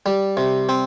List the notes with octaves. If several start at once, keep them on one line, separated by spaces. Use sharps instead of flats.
G3
C3
C4